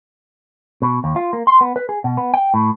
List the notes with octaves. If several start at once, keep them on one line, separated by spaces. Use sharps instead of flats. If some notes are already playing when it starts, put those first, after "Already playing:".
B2
D#2
F4
A#3
C6
B3
B4
G#4
B2
B3
G5
A2